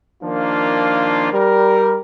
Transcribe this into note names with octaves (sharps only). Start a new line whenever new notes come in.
D#3 F3 A#3 D4 F4
G3 A#4